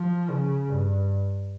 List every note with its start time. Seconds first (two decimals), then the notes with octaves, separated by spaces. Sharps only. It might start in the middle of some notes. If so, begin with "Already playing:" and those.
Already playing: F3
0.29 C#3
0.68 G2